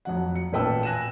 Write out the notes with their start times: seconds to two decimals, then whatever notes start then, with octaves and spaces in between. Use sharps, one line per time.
0.05 F2 F#3 F#5
0.35 C#7
0.52 A1 A#2 B4 G5 A5 E6
0.83 G#5 F#6 A#6 D#7 E7